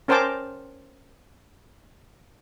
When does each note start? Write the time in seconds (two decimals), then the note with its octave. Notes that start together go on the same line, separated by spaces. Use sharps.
0.08 C#4 A#4 C5 G5 A5 D6